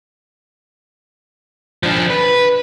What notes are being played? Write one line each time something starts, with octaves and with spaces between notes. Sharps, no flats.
F3 D4
B4